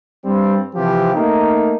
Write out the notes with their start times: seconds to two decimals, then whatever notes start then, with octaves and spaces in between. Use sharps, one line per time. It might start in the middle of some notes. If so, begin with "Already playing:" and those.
0.24 G2 G3 C4
0.75 C3 E3 F3 G4
1.15 A3 A#3 D#4